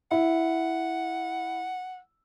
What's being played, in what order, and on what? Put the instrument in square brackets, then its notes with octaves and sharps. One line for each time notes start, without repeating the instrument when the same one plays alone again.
[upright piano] E4 [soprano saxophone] F#5